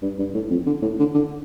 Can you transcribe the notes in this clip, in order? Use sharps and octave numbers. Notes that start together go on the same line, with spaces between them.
G2
G2
A2
F2
D3
A2
D3
D3